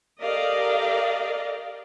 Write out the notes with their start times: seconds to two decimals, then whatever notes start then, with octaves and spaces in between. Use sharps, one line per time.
0.21 G4 A4 A#4 D5 D#5 F5